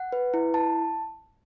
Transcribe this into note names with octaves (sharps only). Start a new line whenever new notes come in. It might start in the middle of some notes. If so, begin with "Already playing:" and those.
Already playing: F#5
B4
E4
A5